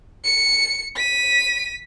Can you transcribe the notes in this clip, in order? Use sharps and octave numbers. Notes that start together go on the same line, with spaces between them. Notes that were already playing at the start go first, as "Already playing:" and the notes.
C#7
B6 D#7